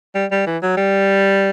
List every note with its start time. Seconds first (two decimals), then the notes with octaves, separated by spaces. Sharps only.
0.15 G3
0.32 G3
0.47 E3
0.62 F#3
0.77 G3